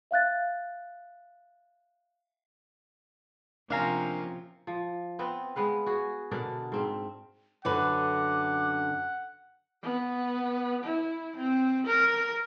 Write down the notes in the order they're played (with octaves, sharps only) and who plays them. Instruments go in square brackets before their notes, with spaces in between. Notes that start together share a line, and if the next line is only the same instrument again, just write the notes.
[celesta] E5 F5 F#6 A6
[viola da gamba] C3 F3 [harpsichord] A#3 C#4 [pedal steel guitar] D4 F5 A#5
[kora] F3
B3 C4 B4
G#3 B3 B4 F5
F#4 G#4
B2 D3 D4 A#4
G#2 C4 E5
[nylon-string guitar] F#2 D3 B4 [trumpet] F#5 [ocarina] D6
[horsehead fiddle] B3
E4
C4
A#4